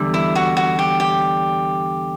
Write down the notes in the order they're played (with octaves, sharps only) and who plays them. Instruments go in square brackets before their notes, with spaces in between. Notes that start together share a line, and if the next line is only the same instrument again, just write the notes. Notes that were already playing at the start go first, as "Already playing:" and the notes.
Already playing: [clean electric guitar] E2 D3 G3
[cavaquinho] E4
F#4
F#4
G4
G4